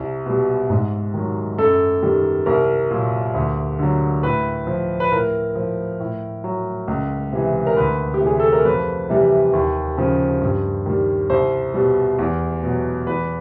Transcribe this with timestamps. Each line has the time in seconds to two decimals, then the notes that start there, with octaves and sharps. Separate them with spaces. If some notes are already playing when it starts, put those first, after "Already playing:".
Already playing: C2
0.26 B2 G3
0.70 G#2
1.14 D#3 F#3
1.58 F#2 A4
2.03 D#3 G3
2.46 C2 A#4
2.91 A#2 F#3
3.34 D2
3.79 D3 F#3
4.23 A2 B4
4.67 F3
5.00 B4
5.12 A2 A#4
5.56 F3
6.00 A2
6.44 F#3
6.88 C#2
7.33 C3 E3
7.67 A#4
7.76 D2 B4
8.14 G4
8.20 C3 E3
8.27 G#4
8.40 A4
8.52 A#4
8.65 F2 B4
9.09 C3 E3 G3
9.53 D#2
9.98 C#3 F3
10.41 G2
10.86 D#3 G3
11.30 C2 C5
11.74 B2 G3
12.19 E2
12.63 B2 F#3
13.07 E2 B4